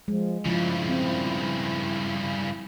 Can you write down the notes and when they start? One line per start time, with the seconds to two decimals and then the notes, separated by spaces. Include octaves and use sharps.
0.08 F3 G#3
0.46 G2 C#3 F3 E4
0.90 C4